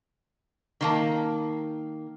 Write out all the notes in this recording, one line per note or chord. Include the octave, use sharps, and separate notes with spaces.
D#3 A#3 A5